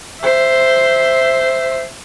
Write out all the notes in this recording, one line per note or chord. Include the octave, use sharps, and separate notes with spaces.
C5 E5